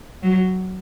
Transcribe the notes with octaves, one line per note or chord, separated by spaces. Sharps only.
F#3